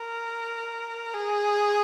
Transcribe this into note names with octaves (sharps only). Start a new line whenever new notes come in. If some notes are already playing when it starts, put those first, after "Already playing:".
Already playing: A#4
G#4